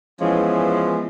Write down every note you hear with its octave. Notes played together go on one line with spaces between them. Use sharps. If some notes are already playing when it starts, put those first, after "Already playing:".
E3 F3 G#3 B3 C#4